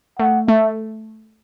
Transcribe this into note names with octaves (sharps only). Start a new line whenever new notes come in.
A3 F#5
A3 E5